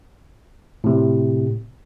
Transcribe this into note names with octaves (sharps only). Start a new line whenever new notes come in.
A2 C3